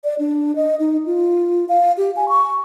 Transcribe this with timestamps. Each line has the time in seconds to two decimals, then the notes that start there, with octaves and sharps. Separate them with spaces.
0.04 D5
0.19 D4
0.56 D#5
0.80 D#4
1.06 F4
1.69 F5
1.97 G4
2.16 G#5
2.29 C#6